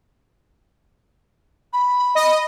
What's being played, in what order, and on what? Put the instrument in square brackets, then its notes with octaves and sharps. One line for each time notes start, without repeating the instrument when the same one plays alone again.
[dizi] B5
[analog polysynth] D#5